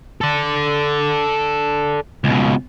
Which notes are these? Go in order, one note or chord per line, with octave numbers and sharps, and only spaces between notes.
A4 D5
C#2 B2